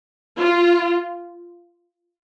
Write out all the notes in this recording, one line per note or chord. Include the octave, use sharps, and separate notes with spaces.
F4